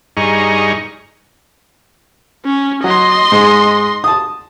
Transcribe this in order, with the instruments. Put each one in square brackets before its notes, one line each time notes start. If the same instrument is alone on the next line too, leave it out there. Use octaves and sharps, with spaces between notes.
[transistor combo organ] G2 D#4 G#4 A#5 C#6
[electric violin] C#4
[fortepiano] F#3 [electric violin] D#5 C6
[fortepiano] G#2
A5 D#6